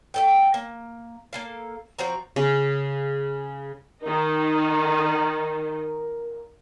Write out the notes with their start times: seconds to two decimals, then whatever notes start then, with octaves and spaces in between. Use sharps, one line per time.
0.14 A3 A4 G5
0.54 A#3
1.33 A#3 A4 F5
1.99 F3 C4 F#4 A#5
2.36 C#3
4.03 D#3 D#4 A#4